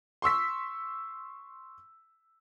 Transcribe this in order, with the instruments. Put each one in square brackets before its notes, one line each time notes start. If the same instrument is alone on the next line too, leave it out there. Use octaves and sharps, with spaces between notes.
[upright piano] C6 C#6 E6 B6